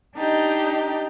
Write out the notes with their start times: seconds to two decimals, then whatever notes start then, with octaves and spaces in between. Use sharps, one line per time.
0.16 D4 D#4 G4 D#5